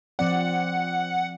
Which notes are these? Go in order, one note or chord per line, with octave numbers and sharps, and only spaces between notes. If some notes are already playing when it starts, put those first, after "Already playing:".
F3 C4 D5 F#5